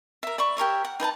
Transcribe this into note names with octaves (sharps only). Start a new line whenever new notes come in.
A#4 E5
D5 E5 B5 C#6
G4 A#4 C#5 E5
F#5
D#4 B4 G#5 A5